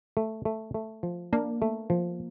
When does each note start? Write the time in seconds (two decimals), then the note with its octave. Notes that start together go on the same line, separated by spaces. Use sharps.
0.17 A3
0.45 A3
0.74 A3
1.03 F3
1.33 A#3 D4
1.62 A3
1.90 F3